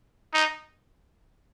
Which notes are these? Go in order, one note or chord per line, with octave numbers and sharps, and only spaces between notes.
D#4